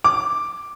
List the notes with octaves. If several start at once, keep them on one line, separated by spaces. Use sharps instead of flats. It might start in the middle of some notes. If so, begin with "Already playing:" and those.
D6